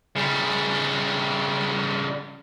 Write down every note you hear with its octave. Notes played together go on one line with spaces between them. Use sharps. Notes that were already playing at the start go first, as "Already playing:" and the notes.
C#3 G3